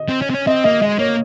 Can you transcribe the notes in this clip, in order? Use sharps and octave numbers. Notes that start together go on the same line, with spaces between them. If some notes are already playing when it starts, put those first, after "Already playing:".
Already playing: D#5
C4
C#4
C4
C#4
C4 D#5
A#3 D#5
G#3 D#5
A#3 C#5